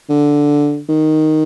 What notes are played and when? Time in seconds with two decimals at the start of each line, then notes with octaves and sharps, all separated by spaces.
0.09 D3
0.89 D#3